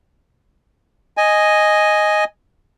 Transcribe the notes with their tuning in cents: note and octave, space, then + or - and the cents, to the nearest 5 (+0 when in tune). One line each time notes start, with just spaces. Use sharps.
D#5 +0 G#5 +0